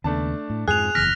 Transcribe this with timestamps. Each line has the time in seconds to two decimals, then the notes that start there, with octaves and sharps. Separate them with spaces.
0.04 D#2 C#3 A3 B3 D4 A5
0.50 A2
0.68 F2 G#2 F3 G#4 F#6 F7
0.95 F#1 E2 F6 A#6 B6